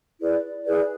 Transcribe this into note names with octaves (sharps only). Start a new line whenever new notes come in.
E4 G#4 B4 D5
E4 G#4 B4 D5